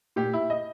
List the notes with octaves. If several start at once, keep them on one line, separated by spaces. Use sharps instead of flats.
A#2 G4
E4
D#5